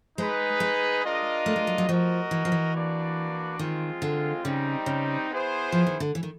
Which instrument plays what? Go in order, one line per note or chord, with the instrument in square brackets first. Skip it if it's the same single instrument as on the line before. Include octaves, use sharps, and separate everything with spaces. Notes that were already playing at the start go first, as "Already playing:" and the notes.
[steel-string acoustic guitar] G#3 [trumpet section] D#4 G#4 B4
[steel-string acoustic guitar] G#3
[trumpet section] D4 F4 A#4 D#5
[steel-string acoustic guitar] A3
G#3
F#3
F#3
[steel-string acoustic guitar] F3 [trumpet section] F#4 A#4 D#5
[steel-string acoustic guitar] E3
F3
E3
[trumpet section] A#3 D4 F#4 B4 D5
[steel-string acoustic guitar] D#3 [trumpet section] G#3 C4 F4
[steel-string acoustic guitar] D3
[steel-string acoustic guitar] C#3 [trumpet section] G3 C4 D#4
[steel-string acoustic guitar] C#3
[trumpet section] B3 E4 G#4 C5
[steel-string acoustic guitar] F3
D#3
D3
E3
D#3